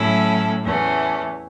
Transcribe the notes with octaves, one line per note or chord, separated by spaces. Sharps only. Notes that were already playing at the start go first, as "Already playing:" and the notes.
Already playing: A2 F#3 C#4 E4 A4
E2 E3 A3 C#4